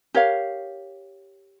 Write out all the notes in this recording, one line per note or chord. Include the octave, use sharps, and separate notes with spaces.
G4 A#4 C#5 F5